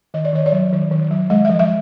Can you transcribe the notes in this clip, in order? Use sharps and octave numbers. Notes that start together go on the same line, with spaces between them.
D#3 D#5
D5
D#3 C#5
D5
F#3
D#3
D#3
F#3
G#3 D#5
F3 E5
E5